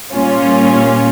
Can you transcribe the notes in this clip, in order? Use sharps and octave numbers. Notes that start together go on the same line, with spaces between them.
A#2 G3 A#3 C#4 F4